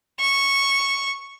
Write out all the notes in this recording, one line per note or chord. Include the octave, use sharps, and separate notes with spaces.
C#6